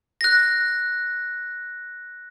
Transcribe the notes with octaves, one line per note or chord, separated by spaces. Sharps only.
F#6 A#6